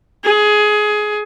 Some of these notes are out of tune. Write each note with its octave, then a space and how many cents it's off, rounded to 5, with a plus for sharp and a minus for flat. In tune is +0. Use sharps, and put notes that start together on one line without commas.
G#4 +20